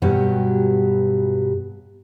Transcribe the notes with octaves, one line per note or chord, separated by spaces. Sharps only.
G2 B2 F#3 G4